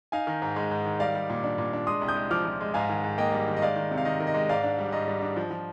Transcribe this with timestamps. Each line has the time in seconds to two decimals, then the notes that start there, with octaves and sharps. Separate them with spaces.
0.12 D#4 F5 G#5
0.27 D#3
0.42 G#2
0.56 G#3
0.71 G#2
0.86 D#3
1.00 G3 D5 F5
1.15 G3
1.30 A#2
1.44 D4
1.58 A#2
1.73 D4
1.87 G#3 C6 D#6
2.02 C2
2.08 D#6 G6
2.16 G#3
2.31 F3 D6 F6
2.46 F3
2.61 G#3
2.74 G#2 F5 G#5
2.89 D#3
3.04 G#2
3.18 A#3 D#5 G5
3.33 G3
3.47 D#3
3.57 D#5
3.62 G#3 D5 F5
3.76 D#3
3.91 C3
3.98 F5
4.05 D#3 D#5
4.20 D#3
4.27 D#5
4.34 G#3
4.49 G#2 D5 F5
4.63 D4
4.79 G3
4.92 G#2 D#5
5.08 G3
5.22 D4
5.36 F3
5.51 F3